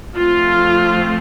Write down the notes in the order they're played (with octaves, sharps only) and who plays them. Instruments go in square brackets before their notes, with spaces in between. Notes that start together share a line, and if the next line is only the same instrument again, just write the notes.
[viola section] F3 A3 C4 F4